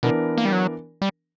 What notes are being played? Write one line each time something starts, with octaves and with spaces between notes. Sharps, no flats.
B2 E3 B3 D4 A#4
A#3
G3
F#3
G3